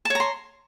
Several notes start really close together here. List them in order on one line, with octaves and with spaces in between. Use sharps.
A5 C#5 A#5 C6